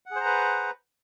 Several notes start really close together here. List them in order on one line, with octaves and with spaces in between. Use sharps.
F#5 G#4 C5 A#5 B4